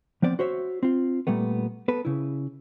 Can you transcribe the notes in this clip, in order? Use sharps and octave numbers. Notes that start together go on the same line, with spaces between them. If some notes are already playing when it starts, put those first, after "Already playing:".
F3 B3 C4 D5
F#4 C5 C#5 E5
C4 F4
A#2 G3 A3 B3
B3 A4 B4
C#3 E4